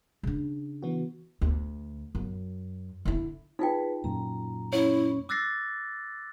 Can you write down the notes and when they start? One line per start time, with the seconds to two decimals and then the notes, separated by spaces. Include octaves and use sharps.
0.23 C#3 D4
0.83 E3 B3 F#4
1.41 D2
2.15 F#2
3.05 D3 E4
3.59 D#4 F4 G#4 B4 G5
4.04 F#2 A#2 A#5
4.73 C#4 E4 C#5
5.29 D6 E6 F#6 A6 A#6 C7